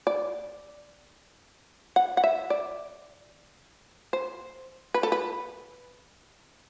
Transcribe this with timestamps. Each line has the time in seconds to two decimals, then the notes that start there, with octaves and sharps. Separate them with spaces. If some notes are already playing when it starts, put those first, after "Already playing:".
0.07 D5
1.96 F#5
2.17 F#5
2.24 E5
2.50 D5
4.13 C5
4.94 B4
5.03 A4
5.12 B4